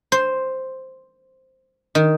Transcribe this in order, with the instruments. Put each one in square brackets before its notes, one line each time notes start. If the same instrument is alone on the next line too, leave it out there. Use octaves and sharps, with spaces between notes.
[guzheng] C5
D#3